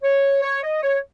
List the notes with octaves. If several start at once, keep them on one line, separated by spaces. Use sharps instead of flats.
C#5
C#5
D#5
C#5